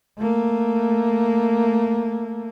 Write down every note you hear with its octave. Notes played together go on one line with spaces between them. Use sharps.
A3 A#3